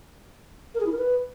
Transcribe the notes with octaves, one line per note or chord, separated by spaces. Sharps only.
A#4
G#4
E4
A#4
B4